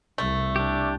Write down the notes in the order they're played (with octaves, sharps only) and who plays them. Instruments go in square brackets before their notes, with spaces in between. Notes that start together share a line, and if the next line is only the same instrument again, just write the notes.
[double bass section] C2 [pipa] A3
[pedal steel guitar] D4 G4